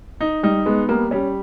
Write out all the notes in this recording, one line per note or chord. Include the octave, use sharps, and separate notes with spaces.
D#4
G3 D#4
G#3 B3
G3 A#3
G3 C#4